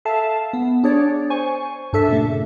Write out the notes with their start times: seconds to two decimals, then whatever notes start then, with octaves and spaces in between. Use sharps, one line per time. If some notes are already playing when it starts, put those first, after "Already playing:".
0.05 A4 E5 F5 A5
0.53 B3
0.84 D4 G#4 C#5 D5
1.30 C5 G#5 C#6
1.93 G2 D4 A4 E5
2.08 A#2 C#3 A3